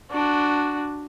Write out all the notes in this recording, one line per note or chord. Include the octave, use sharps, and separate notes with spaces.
D4 F#4